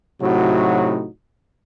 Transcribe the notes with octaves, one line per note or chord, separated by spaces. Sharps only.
A2 C3 F#3 D#4 F#4